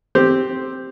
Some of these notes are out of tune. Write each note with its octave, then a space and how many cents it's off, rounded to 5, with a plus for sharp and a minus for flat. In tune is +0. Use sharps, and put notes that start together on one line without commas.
C4 +0 G4 +0